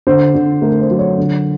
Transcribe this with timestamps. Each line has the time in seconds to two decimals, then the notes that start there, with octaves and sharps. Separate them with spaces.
0.07 D3 C5
0.34 D3
0.62 A3 A#4
0.81 C5
0.90 F#3
0.99 C#5
1.18 D3